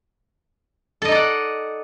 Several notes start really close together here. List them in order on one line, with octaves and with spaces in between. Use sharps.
A4 D#5 D#4 D5 F#5